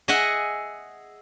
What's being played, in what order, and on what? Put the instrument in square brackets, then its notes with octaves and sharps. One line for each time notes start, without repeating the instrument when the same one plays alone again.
[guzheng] G#4 D#5 E5 F#5 G#5